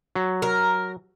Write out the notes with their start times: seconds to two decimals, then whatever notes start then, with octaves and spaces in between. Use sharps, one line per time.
0.15 F#3
0.42 A#4